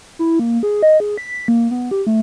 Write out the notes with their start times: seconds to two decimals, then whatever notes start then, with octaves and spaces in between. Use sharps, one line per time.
0.19 E4
0.39 A#3
0.63 G#4
0.83 D#5
1.00 G#4
1.18 B6
1.48 A#3
1.71 B3
1.91 G4
2.07 A3